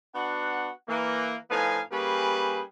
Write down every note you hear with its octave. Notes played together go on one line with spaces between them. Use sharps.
B3 D4 F#4 F#5
E3 A#3
A2 F3 D#4 B4 F5 G#5
G3 A#3 C#4 G4 G#4 B4